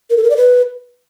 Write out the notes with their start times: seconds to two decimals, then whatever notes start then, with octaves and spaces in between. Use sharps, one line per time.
0.10 A#4
0.17 A4
0.24 A#4
0.30 D5
0.37 B4